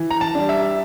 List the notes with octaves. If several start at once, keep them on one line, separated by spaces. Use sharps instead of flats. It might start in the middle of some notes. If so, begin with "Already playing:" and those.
Already playing: E3
A#5
A5
G3 D4
E5